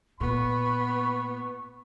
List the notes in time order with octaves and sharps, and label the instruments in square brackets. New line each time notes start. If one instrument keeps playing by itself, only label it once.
[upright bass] A#2 [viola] B3 [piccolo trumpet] B5 [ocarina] C#6